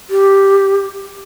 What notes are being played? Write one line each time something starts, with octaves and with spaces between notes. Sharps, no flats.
G4